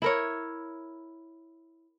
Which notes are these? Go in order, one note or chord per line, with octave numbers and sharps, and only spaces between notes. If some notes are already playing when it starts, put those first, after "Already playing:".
E4 A#4 C#5